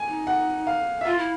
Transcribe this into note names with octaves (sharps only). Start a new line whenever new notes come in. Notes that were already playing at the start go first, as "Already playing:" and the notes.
Already playing: G#5
D#4
F#5
F5
E5
F4 F5
E4